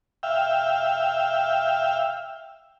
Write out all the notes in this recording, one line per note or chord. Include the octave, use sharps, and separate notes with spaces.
E5 F5 G5